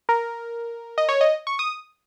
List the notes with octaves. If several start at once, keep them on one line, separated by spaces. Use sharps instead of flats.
A#4
D#5
C#5
D#5
C#6
D#6